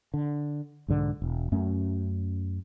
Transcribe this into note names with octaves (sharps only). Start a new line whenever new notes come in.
D3
B1 G#2 D3
E1
F#2 A3 C#4